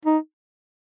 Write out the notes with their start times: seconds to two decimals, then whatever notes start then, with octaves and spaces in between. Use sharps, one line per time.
0.05 D#4